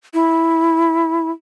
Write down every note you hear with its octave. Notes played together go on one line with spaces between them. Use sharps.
E4